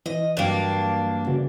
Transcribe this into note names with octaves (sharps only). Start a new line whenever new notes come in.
E3 D#5
G2 F#3 A#3 D4 G5
C#3 E3 F#4